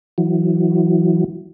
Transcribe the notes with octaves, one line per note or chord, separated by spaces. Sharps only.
E3 F#3